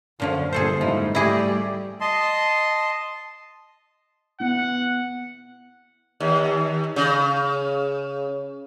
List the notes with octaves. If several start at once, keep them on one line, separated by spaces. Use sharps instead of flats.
F#2 A#2 D3 F3 C#4
G1 A#2 G#4 A4 C5
F#1 G#2 F3 D#4 E4
G3 A3 E4 G4 G#4 D5 D#5
D#5 A5 C6
B3 E4 F#5
D#2
C#3